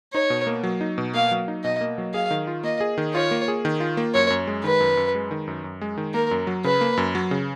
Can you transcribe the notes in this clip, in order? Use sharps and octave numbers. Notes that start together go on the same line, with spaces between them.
D#4 C#5
B2
A#3
F#3
D#4
B2
A#3 F5
F#3
D#4
B2 D#5
A#3
F#3
G#4 F5
D#3
F4
A#3 D#5
G#4
D#3
F4 C#5
A#3
G#4
D#3
F4
A#3
F#2 C#5
F#2
G#3
D#3 B4
F#2
F#2
G#3
D#3
F#2
F#2
G#3
D#3
A#3 A#4
F#2
F#3
C#3 B4
A#3
F#2
F#3
C#3